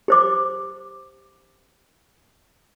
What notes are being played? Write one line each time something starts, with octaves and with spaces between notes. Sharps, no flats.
G4 C5 D6